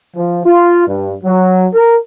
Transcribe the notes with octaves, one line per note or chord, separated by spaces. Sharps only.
F3
F4
G2
F#3
A#4